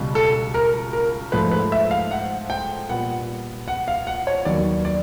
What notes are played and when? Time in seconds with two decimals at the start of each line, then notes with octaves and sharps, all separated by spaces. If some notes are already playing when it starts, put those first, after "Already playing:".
Already playing: C#2 B2 G3
0.15 A4
0.54 A#4
0.93 A#4
1.32 G#2 F3 A3 B4
1.51 B4
1.72 E5
1.91 F5
2.11 F#5
2.50 G5
2.89 A#2 G3 B3 F#5
3.68 F#5
3.88 F5
4.07 F#5
4.27 C#5
4.45 D#2 D#3 F#3 B3 D5
4.85 D5